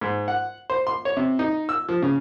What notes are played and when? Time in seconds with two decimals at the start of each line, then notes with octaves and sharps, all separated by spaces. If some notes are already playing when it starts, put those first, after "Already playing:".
0.01 G#2
0.28 F#5
0.70 C5
0.87 C6
1.05 C#5
1.17 C3
1.39 D#4
1.69 E6
1.89 F3
2.02 C#3